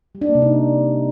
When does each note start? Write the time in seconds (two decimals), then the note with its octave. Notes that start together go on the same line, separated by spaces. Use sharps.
0.15 G3
0.21 D4
0.28 A#3
0.35 C3
0.42 D#4